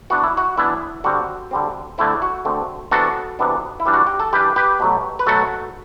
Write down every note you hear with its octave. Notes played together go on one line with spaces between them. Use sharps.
E3 B3 D4 F#4
E4
F#4
E3 B3 D4 E4
D3 G3 C4 F#4
D3 G3 C4
D3 A3 C4 E4
F#4
D3 A3 C4
C3 E3 B3 D4 F#4 A4
C3 E3 B3 D4
E4
E3 G3 D4
F#4
G4
A4
E3 G3 D4 G4 B4
G4 B4
B2 F#3 A3
B4
B2 F#3 A3 F#4 A4